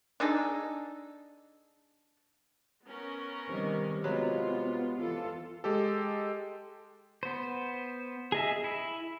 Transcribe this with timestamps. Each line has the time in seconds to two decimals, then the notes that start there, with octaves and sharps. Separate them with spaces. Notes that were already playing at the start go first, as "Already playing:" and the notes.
0.20 D4 D#4 G#4 A4
2.86 B3 C#4 A#4
3.50 C3 D#3 G3
4.04 F#3 G#3 B3 F4 B4
4.98 E3 F4 A4
5.64 G#3 G4 A4
7.23 B3 C5
8.32 G#4 D#5 E5
8.64 E4